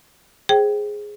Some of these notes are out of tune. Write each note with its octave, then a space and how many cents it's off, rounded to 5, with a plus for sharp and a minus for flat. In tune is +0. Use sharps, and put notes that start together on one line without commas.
G#4 +0 C5 +20 G5 -10